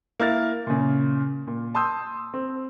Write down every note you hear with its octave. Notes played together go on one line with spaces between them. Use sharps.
A#3 E4 F6 A6
A#2 C#3
A#2
A5 C6 D#6 E6 G6
C4